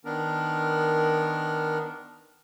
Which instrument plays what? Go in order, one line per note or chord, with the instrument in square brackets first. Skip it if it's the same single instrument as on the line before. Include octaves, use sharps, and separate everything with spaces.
[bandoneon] D#3 B3 D4 A#4